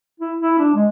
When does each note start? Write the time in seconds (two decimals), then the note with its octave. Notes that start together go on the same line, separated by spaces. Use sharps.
0.20 E4
0.39 E4
0.59 D4
0.75 G#3